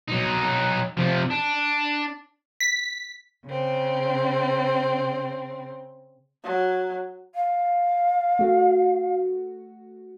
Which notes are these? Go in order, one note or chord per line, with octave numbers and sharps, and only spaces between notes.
F#3 D#4
C3 F3
D4
B6
C#3 C4
F#3
F5
A3 F#4